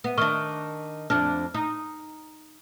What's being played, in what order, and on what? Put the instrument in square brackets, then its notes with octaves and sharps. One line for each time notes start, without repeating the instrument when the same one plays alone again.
[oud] B3
[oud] D#3 D4 [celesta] C#6 F6 G7
[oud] F2 D4 [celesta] F6
[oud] D#4